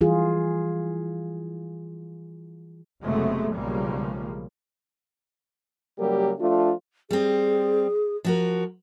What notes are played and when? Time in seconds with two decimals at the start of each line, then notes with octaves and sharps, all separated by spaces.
0.01 E3 G3 F4 G#4
3.03 F#1 C3 F#3 G#3 A3 B3
3.54 B1 C#3 F3 G3 G#3 A#3
5.98 C#3 F#3 G3 A#3 G4 A#4
6.39 F3 A3 D4 F4
7.11 G3 C4 G#4
8.25 F3 F#4 A#4